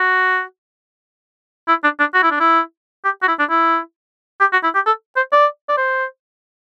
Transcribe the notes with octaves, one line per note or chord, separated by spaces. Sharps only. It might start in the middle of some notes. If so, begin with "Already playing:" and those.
Already playing: F#4
E4
D4
D4
F#4
E4
D4
E4
G4
F#4
E4
D4
E4
G4
F#4
E4
G4
A4
C5
D5
D5
C5